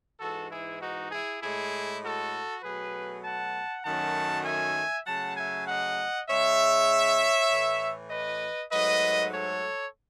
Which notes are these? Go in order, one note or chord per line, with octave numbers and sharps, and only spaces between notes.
G#2 E3 G#3 F#4 A4
E4 G#4
D#4 F#4
E4 G#4
A2 G#3 E4 G#4
F#4 A4
B2 F#3 A3 G#4 B4
F#5 A5
F#2 D#3 F#3 A3 F#5 A5
E5 G#5
C#3 F#3 A3 F#5 A5
E5 G#5
D#5 F#5
C#3 G#3 C#5 E5
A2 E3 A3
B4 D#5
G#2 F#3 A3 B4 D#5
A4 C#5